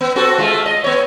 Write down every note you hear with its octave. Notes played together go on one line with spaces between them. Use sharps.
B3
C4 F#4 A4
G#3 A3 F4
D#5
B3 C#5